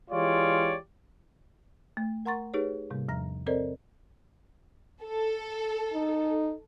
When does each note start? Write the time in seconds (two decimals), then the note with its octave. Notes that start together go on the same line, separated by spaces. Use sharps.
0.11 E3 G#3 F4 G4 C#5 D5
1.97 A3
2.25 A#4 F#5 A#5 C6 C#6 A6
2.54 D#4 G4 G#4 B4 C#5
2.90 G#2 C3 G3 A#3
3.08 E2 F3 A#5 A#6
3.46 C4 A4 A#4 C5 D5 D#5
5.03 A4
5.94 D#4